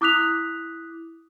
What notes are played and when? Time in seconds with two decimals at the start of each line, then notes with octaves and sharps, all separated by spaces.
0.01 E4 D6 D#6 F#6 B6 F7